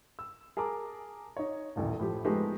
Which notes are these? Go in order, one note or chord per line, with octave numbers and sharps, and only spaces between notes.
E6
G#4 A#4 A5 A#5 D6
D#4 C#5
D#1 A1 D2
A2 F3 G4
F3 G#3 A3 B3 D#4 G4